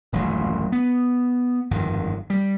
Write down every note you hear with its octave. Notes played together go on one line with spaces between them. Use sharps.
D#1 A1 F#2 F#3
B3
G1 F2 G#2 D#3
G3